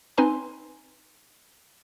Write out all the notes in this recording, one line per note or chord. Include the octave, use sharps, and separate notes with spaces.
C4 D#4 B4 G#5 C6